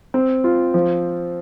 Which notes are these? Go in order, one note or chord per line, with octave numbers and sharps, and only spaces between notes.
C4
F4
F3